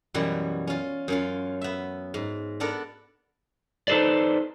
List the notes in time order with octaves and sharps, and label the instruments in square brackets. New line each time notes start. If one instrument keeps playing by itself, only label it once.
[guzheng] F#2 B2 E3 G3 E4 F#4
C#4 F4
F#2 C#4 F4
B3 E5
G#2
B3 D4 A4 A#4
[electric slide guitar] D#4 A4 B4 C5 D5